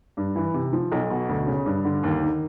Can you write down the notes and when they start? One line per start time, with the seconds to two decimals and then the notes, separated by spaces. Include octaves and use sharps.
0.17 G2
0.36 E3
0.54 C3
0.73 F3
0.92 B1
1.10 B2
1.29 D2
1.47 C#3
1.66 G2
1.85 D3
2.03 D#2
2.22 D#3